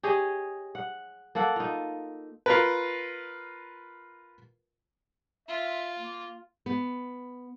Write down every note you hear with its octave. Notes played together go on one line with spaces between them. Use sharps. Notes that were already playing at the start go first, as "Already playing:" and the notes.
G4 G#4 C#5 D#5
F#5
A#3 A4 F#5
D#4 F4
F4 A#4 B4
F4 E5
A#3
B3